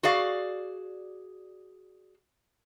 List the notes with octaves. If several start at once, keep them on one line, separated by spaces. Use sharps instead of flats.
F#4 G#4 D5 F5